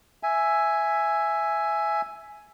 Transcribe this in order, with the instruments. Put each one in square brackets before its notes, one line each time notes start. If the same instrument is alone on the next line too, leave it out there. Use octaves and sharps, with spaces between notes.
[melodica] E5 G#5